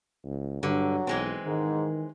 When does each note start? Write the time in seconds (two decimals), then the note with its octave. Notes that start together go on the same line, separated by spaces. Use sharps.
0.24 C#2
0.63 G2 D3 F#3
1.07 B1 E3 G#3 C4
1.46 G#2 D#3